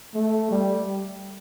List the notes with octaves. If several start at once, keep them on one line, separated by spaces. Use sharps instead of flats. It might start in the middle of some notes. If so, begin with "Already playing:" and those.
A3
G3